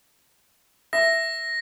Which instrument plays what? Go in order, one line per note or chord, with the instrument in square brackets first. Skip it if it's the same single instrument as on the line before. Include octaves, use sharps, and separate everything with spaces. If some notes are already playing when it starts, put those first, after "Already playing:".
[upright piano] E5 [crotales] A#6